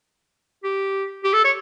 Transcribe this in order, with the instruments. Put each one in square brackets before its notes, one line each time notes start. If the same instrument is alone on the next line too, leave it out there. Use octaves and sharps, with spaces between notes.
[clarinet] G4
G4
A4
C#5